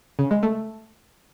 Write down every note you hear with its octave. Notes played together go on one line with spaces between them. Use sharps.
C#3
G#3
A3